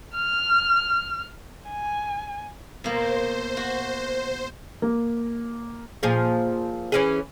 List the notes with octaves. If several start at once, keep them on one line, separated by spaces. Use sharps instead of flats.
F6
G#5
B2 A#3 C5
F#4
A#3
A#2 F3 G#4
E3 C#4 G#4